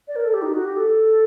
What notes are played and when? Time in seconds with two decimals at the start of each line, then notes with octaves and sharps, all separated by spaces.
0.08 D5
0.16 A#4
0.25 A4
0.34 G4
0.42 D#4
0.54 F#4
0.65 G4
0.77 A4